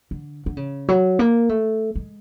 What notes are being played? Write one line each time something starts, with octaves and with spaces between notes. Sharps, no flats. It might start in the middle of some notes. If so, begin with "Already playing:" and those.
D3
D3
C#3
F#3
A#3
A3
G#3